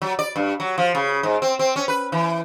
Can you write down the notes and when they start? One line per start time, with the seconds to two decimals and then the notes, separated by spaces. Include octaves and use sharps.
0.02 F#3
0.19 D5
0.36 G2
0.60 F#3
0.78 F3
0.95 C#3
1.23 G#2
1.42 C4
1.59 C4
1.76 C#4
1.88 B4
2.12 E3